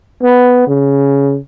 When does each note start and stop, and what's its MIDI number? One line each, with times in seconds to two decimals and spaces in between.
0.23 0.64 59
0.67 1.37 49